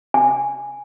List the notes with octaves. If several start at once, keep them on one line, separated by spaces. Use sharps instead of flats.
G#5